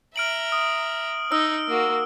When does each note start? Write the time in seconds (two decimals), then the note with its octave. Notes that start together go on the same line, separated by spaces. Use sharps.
0.16 E5 A#5 F6 D7 F#7
0.52 D#6
1.32 D#4 E6
1.68 A#3 F#4